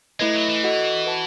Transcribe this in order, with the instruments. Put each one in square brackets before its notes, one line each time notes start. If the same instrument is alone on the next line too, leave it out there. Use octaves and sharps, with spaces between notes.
[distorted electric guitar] G#3 [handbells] A3 E4 B4 D#5
[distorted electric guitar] F#3
E3
[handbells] F#4 A4 D#5 F#5
F#4 B4 F#5 A5